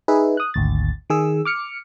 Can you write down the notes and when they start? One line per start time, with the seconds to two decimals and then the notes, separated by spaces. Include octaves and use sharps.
0.08 D#4 G#4 B4 E5
0.37 D#6 F#6
0.54 G#1 D2 A6
1.10 D#3 G#4 E6
1.45 D6 F6 C#7